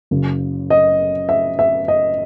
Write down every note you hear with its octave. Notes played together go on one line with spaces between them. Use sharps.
F#1 F#2 C#3
D#5
E5
E5
D#5